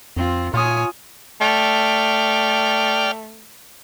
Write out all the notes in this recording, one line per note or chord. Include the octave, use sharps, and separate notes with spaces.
F2 C4 F4
A#2 F4 C#5 G#5 D#6
A3 D5 G5 F6